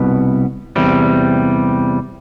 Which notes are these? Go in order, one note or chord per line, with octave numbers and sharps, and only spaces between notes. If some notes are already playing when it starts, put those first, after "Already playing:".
Already playing: C2 B2 B3
E2 C3 G3